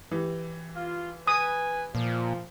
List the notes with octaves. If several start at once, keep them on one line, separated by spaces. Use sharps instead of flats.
E3 G4
F4
B4 G#5 D#6
A#2 F3